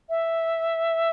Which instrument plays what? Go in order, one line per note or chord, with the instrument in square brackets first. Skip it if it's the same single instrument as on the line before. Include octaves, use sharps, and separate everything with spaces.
[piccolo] E5